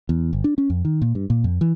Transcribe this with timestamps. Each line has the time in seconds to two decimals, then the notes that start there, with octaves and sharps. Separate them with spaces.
0.09 E2
0.33 G1
0.44 D4
0.58 C#4
0.70 F2
0.85 D#3
1.02 A#2
1.15 G2
1.30 A#2
1.44 F2
1.61 E3